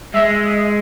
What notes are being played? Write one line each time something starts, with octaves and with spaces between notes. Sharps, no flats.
G#3 E5
D#5